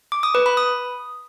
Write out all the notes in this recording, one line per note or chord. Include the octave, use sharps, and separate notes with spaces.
D6
D#6
B4
B5
D#6